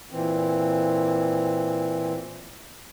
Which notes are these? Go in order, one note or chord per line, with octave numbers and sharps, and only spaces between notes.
A#2 E3 C4